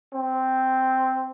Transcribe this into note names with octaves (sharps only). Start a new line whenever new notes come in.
C4